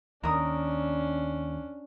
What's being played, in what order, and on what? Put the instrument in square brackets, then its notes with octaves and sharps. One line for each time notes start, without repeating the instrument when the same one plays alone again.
[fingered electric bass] D#2 [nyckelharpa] C#4 D4 [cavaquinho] A#4 D#6